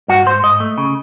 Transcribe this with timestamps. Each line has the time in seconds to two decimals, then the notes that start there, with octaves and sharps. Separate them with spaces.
0.08 G2 F#4
0.26 G#2 C5
0.43 G#2 D#5
0.60 A3
0.78 C#3